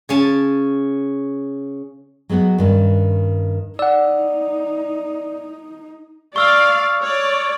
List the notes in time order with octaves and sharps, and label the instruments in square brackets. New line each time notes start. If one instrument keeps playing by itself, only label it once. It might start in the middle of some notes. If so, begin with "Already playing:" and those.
[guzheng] C#3 C#4 A5
[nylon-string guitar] F#3 G#3 B3 E4 F#4
G2 D#3 C#4
[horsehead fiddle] D#4 [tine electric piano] D5 [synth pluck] F#5 E6
[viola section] D5 F5 [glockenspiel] C#6 E6 F6
[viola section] C#5 D5